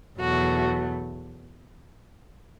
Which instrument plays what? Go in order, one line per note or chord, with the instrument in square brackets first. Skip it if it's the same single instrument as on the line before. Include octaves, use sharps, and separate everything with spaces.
[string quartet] E2 B2 F#3 A3 F#4